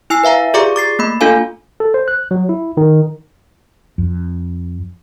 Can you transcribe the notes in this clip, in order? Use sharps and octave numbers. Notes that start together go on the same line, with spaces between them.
E4 G#5 E6 C7
B4 E5 F5 A#5
F4 G4 G#4 D5 A#5 D6
D6 A6 C7
A3 A#3 B5
A#3 D4 F4 A4 F5 G#5
A4
C5
F#6
F#3
E4
D#3
F2